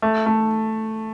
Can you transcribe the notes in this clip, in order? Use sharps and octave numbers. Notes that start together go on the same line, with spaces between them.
A3
A3